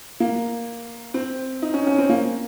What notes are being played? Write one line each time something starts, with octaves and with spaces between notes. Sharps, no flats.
A#3
C4
D#4
C#4
C#4
C4
A#3